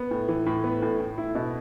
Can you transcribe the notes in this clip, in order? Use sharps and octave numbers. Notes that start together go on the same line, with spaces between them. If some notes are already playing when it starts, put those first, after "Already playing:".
Already playing: B3
A2
E3
A2
B3
A2
A2
E4
B2